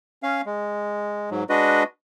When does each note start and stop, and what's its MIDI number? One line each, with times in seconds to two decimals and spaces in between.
0.23 0.41 61
0.23 0.41 77
0.46 1.30 56
1.31 1.44 44
1.31 1.44 54
1.50 1.83 56
1.50 1.83 62
1.50 1.83 66
1.50 1.83 71
1.50 1.83 75